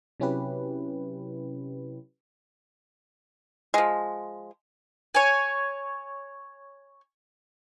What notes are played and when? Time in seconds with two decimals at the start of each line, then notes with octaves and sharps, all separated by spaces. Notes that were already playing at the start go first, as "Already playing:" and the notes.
0.20 C3 F#3 C#4 E4 G4 B4
3.74 F3 G#3
5.15 C#5 G#5